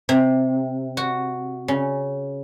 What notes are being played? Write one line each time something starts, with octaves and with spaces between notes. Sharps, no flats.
C3
F#4
C#3